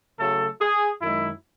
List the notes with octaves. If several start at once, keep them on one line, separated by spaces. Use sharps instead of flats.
C#3 F#3 A3 A4
G#4
F#2 D#3 G#3 E4